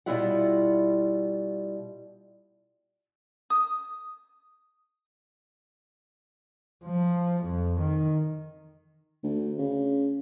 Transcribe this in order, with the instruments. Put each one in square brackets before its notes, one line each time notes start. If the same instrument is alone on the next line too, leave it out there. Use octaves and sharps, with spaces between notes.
[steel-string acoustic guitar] B2 G3 E4 F4 E5 F#5
[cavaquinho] D#6
[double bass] F3
F2
D#3
[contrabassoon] D2
C#3